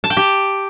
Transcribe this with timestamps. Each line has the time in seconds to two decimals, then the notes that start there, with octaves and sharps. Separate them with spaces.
0.04 A5
0.10 G5
0.17 G4